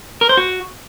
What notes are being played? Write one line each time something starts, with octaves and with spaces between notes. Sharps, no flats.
A#4
C5
F#4